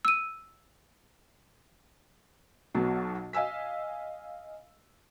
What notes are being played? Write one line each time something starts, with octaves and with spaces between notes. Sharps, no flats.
E6 D#7
B1 B2 F#3
D#5 F5 G#5 E6 B6